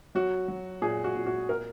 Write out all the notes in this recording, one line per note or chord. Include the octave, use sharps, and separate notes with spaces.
F#3 F#4
F#3
A#2 G#4
F#4
A#2
F#4
A#4